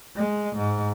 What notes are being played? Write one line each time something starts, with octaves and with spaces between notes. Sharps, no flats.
G#3
G#2